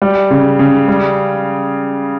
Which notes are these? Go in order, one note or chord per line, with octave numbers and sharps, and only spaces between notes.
G3
C#3
C#3
G3